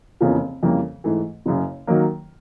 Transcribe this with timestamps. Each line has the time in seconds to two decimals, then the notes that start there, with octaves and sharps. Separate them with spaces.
0.21 F1 E2 C#3 F3 A#3
0.63 F2 C#3 E3 G3 A#3
1.04 G#2 E3 A3
1.46 F#1 F#2 C#3
1.87 D#3 F#3 A#3